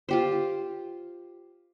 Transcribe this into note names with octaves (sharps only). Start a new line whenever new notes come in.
F4 G4 C5